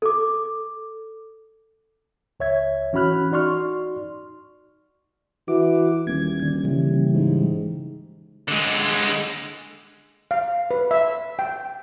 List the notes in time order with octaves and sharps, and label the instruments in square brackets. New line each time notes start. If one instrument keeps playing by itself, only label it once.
[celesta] A4 D6
[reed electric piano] C#2 C#5 E5 G#6
E3 C#4 F#4 B5 F6 F#6
D#4 F#4 D5 C6 C#6 F6
[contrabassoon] E3 [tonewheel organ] F#4 D6
[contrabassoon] D#1 [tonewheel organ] G#6
[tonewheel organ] D3
C#3 E3 G3
[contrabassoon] G#2
[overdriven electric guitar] D3 G#3
[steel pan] F5
B4
E5
G5